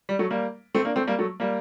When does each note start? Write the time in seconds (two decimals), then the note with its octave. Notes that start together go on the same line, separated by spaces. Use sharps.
0.09 G3
0.19 F#3 A3
0.31 G3 A#3
0.75 A3 C4
0.85 A#3 D4
0.96 A3 C4
1.07 G3 A#3
1.19 F#3 A3
1.40 G3 A#3